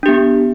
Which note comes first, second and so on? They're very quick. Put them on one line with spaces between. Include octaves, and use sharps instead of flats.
D4 G4 B3